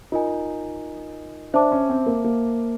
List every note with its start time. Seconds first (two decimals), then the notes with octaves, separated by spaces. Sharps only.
0.12 D#4 F4 A#4 D#5 G#5
1.54 D4 C5 E5 A5 D6
1.72 C#4
1.89 C4
2.06 A#3
2.24 A#3